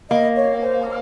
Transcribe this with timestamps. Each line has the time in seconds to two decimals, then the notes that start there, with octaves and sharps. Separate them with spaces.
0.10 A#3 D#5
0.36 C#5
0.62 C5